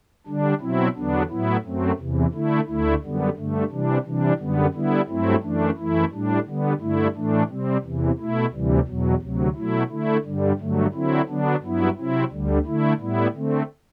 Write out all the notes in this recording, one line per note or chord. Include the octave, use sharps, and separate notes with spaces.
D3 G3 D4
B2 F#3 C4 E4
E2 D3 F#3 B3 D4
A2 F#3 B3 E4
F#2 F#3 A3 C4
E2 C3 E3
D3 A3 E4
D2 D3 A3 E4
F#2 D3 G3 B3
G2 D3 A3
C3 E3 G3 D4
C3 E3 G3 D4
F#2 D3 G3 B3
D3 G3 B3 E4
G2 F#3 A3 C4 E4
F#2 E3 A3 D4
F#2 E3 A3 E4
A2 G3 D4
D3 G3 B3
G2 D3 A3 E4
A2 E3 A3 D4
C3 G3 C4
E2 C3 E3
B2 A3 E4
D2 C3 E3 G3
E2 B2 F#3
D2 C3 F#3
B2 F#3 A3 E4
D3 A3 E4
G2 D3 G3
G2 D3 F#3 A3
D3 F#3 C4 E4
D3 F#3 B3 D4
G2 F#3 B3 E4
C3 F#3 C4 E4
D2 D3 G3
D3 A3 E4
A2 G3 B3 E4
D3 A3 C4